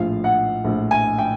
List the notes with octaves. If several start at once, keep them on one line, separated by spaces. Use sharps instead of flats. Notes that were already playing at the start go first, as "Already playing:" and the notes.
Already playing: A#1 A2 F3 F5
F#5
A#1 A2 F3
G#5
G5